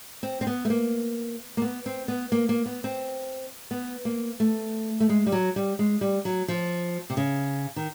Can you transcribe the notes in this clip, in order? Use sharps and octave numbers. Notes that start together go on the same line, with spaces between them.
C4
C4
B3
A3
A#3
A#3
B3
C4
B3
A#3
A#3
B3
C4
B3
A#3
A3
A3
G#3
G3
F#3
G3
G#3
G3
F#3
F3
C3
C#3
D#3